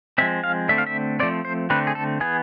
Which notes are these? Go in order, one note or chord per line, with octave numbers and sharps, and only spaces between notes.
F3 G#3 C4 E5
F5
D3 A3 C4 E5
F5
E5
F3 A3 C4 D5
C5
D3 A3 C4 B4
G#4
A4
E3 B3 G#4